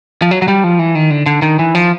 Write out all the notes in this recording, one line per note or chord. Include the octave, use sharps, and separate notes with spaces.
F3
F#3
F#3
G3
F3
E3
D#3
D3
D3
D#3
E3
F3